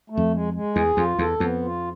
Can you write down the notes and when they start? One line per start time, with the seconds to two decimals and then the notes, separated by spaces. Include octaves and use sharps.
0.10 A3
0.17 F2
0.33 G#3
0.53 G#3
0.75 E2 G#4
0.96 F2 F4
1.19 E2 A4
1.39 F2 B3
1.62 F4